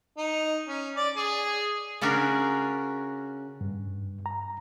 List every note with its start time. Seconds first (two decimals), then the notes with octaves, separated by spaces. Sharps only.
0.18 D#4
0.68 C#4
0.96 D5
1.16 G#4
2.01 C#3 C#4 D4 F#4 G#4 A#4
3.61 G2
4.26 A#5